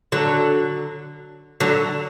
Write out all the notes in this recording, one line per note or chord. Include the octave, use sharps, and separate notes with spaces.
D3 F#3
D3 F#3